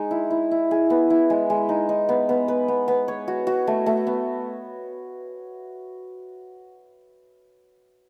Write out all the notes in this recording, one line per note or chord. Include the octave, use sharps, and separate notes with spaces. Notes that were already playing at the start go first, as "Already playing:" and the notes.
Already playing: G#3 D#4
E4
E4
E4
G#4
B3
E4
G#3
G#3
D#4
D#4
B3
B3
B4
B3
B3
C#5
F#4
F#4
A3
A3
B3